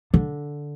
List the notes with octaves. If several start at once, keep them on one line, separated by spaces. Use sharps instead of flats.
D3